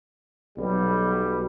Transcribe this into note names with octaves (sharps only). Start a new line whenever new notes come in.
B1 G3